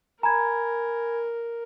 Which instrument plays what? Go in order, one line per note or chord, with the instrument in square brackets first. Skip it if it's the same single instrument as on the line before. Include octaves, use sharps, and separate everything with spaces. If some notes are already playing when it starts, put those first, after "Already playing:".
[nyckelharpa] A#4 [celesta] G#5 B5 G#6 [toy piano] A#5